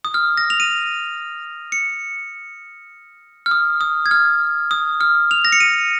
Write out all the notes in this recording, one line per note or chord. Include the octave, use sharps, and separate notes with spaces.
D#6
F6
A#6
F7
D#7
C#7
F6
D#6
D#6
G#6
F6
D#6
F6
F7
A#6
C#7
D#7